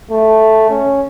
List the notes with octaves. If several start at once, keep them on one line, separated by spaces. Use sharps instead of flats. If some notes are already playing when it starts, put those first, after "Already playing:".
A3
C#4